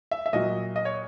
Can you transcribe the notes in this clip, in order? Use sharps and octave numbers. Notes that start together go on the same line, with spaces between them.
E5
E5
A#2 F#3 D#5
D#5
C#5